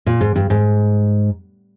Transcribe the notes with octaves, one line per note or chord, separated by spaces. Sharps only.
A#2
G#2
G2
G#2